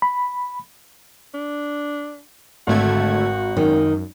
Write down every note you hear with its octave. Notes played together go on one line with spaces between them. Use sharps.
B5
D4
G#1 D3 A3 F#4 G#6
F#2 D#3